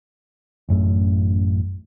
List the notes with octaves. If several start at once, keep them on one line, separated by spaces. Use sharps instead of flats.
A1 F#2 A3